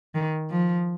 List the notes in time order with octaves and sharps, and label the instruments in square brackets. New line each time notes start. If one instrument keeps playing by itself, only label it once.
[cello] D#3
F3